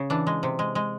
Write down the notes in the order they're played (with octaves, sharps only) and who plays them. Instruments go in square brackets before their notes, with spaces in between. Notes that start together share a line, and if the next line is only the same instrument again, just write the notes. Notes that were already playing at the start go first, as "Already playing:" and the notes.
Already playing: [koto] C#3
E3 D4
G#3
C3
G#3
G#3